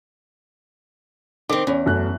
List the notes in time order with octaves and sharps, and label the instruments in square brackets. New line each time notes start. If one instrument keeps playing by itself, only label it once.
[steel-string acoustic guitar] D#3 C4 [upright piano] D6
[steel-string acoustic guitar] E2 [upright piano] C#4
[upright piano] F#2 A3 F#6